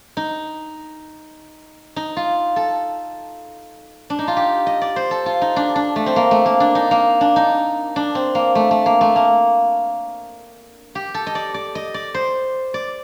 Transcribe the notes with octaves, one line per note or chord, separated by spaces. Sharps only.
D#4
D#4
F4
A4
D4
D#4
F4
G4
D#5
D5
C5
A4
F4
D#4
D4
D4
A3
C4
A#3
A3
A#3
D4
D#4
A#3
D4
D#4
D4
C4
A#3
A3
A3
A#3
A3
A#3
G4
A4
D#5
D5
D5
D#5
D5
C5
D5